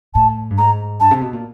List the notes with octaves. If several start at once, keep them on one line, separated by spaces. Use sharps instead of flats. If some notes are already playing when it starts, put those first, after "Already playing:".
A2 A5
G2
G#2 A#5
G2 A5
C3
B2
A#2